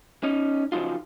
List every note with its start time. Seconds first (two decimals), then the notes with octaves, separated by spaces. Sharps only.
0.23 C#4 D#4
0.72 C#3 F3 F#3 D#4 F4